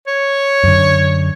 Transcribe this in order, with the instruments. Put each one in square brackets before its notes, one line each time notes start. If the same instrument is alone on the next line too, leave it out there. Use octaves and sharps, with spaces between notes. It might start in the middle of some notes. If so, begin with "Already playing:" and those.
[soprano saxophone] C#5
[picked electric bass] F#2 D3